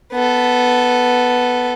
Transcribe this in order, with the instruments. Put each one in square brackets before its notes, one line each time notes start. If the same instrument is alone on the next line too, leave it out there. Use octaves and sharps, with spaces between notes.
[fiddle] B3 A4